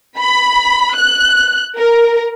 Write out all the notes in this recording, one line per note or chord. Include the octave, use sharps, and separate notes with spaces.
B5
F#6
A#4